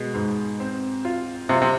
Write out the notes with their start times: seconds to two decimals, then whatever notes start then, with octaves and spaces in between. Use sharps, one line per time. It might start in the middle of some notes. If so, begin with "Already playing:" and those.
Already playing: B2 G#3
0.14 G#2
0.60 C4
1.05 F4
1.49 C3 F4
1.62 C3